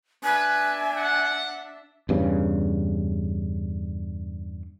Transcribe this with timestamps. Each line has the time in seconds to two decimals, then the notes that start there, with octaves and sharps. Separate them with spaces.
0.23 D4 B4 E5 G#5
0.95 F#5
2.09 E2 G2 C#3